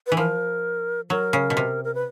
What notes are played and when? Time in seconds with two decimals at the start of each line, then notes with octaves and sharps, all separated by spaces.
0.07 E3 B4
0.17 F3 A#4
1.10 F#3 A#4
1.33 C#3
1.50 B2
1.57 C3
1.84 A#4
1.95 B4